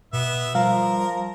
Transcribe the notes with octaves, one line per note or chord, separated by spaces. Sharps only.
B2 B3 E5
F3 G3 A#4 F5